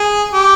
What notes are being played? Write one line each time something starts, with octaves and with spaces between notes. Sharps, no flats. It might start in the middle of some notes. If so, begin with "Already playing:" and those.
Already playing: G#4
G4